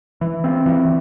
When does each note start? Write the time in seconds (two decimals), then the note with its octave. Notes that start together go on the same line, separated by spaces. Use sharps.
0.21 E3
0.44 C4
0.66 E3